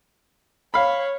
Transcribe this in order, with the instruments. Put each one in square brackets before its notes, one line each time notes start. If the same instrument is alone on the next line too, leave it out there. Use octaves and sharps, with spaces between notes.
[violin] C#5 [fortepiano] F5 B5